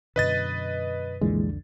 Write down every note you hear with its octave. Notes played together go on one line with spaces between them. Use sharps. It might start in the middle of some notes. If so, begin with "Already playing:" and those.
F#2 B2 D3 B4 D#5 A6
C2 F2 A#2 D3 E3 G#3